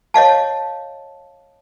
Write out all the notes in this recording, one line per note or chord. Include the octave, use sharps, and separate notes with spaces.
C#5 D#5 F5 A5